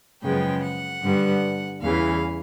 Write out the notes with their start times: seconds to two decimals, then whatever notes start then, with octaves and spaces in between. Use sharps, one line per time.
0.23 F#2 C#3 F3 G#3 B3 G5
0.62 F#5
1.02 G2 D3 G3 B3
1.82 E2 C#3 E3 F5